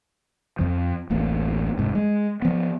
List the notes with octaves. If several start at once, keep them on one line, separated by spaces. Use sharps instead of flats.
F2 F3
D1 A1 A#3
F1 G#2
G#3
F3 B3